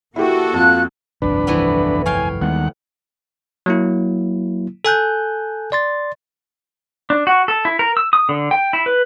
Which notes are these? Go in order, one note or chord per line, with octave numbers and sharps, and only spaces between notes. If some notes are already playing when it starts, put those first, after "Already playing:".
A#3 E4 F#4 G4 A4
F2 F4 A5 F#6
G1 C2 F2 D4 B4
E3 A3 B3
C#5 F5 G5 G#5
D#2 G3 G#3 B3 F#5
F#3 A#3 E4
A4 G#5 F#6 G6
D5 C6 A6
D4
F#4
A4
E4
A#4
E6
D#6
D3
G5
E4
B4